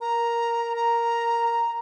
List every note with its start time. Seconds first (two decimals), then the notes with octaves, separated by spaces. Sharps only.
0.01 A#4 A#5
0.76 A#5